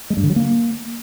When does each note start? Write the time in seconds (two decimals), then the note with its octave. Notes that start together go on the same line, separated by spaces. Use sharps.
0.10 G#3
0.17 G2
0.23 D3
0.30 F#3
0.36 A#3